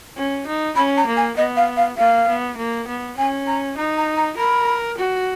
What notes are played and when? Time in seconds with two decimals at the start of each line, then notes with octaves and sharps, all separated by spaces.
0.16 C#4
0.47 D#4
0.76 C#4 B5
0.97 A#5
1.07 A#3
1.17 G#5
1.37 B3 D#5
1.57 F5
1.77 F5
1.97 A#3 F5
2.27 B3
2.57 A#3
2.87 B3
3.17 C#4 G#5
3.47 A#5
3.77 D#4 A#5
3.98 A#5
4.17 A#5
4.37 A#4 B5
4.97 F#4